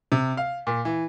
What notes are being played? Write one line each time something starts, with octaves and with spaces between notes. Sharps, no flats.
C3
F5
A#2
E3